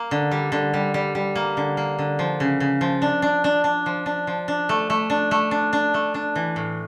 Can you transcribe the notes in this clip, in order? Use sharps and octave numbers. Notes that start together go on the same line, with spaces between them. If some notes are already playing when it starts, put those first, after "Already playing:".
Already playing: A#3
D3
G3
D3
G3
G3
G3
A#3
D3
A#3
D3
F3
C#3
C#3
F3
D4
D4
D4
D4
F3
D4
F3
D4
A3
A3
D4
A3
D4
D4
A3
D4
E3
A2